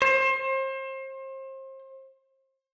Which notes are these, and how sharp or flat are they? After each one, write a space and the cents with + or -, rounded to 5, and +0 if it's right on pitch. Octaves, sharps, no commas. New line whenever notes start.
C5 +35